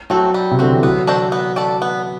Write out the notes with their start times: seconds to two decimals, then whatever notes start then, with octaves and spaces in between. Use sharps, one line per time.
0.10 F#3 A3 C4 F#4 A4
0.34 G3
0.51 C3
0.59 D3 C4 F#4
0.72 E3
0.83 F#3 B3
1.07 D4 F#4 A4 C5
1.32 B3
1.56 F#4 A4 D5
1.82 B3